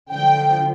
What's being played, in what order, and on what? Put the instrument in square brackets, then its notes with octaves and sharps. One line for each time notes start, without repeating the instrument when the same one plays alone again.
[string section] D3 F3 G5